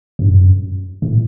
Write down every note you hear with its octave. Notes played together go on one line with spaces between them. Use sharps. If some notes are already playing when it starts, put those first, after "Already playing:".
G2
F#2
A2